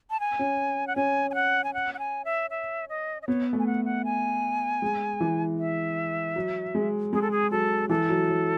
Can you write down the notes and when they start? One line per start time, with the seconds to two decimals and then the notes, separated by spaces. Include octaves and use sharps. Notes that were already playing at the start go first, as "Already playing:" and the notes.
0.10 A5
0.20 G#5
0.39 C#4
0.87 F#5
0.96 C#4 G#5
1.31 G#5
1.35 F#5
1.64 G#5
1.74 F#5
1.94 F#5
1.99 G#5
2.25 E5
2.50 E5
2.90 D#5
3.22 D#5
3.28 B3 C#5
3.53 A3
3.59 G#5
3.67 F#5
3.85 F#5
4.05 G#5
4.82 G#3
5.20 E3
5.59 E5
6.36 F#3
6.75 G#3
7.13 G#3 G#4
7.22 A4
7.31 G#4
7.51 F#3 A4
7.89 E3 A4
8.09 F#3
8.29 F#3